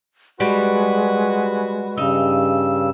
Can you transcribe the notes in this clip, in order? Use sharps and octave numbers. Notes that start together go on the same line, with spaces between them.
G3 G#3 F#4 B4
G2 C#3 D#4 E6